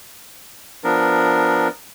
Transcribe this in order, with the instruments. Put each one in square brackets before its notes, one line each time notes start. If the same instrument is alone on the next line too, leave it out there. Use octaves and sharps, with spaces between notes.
[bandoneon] F3 B3 D4 A#4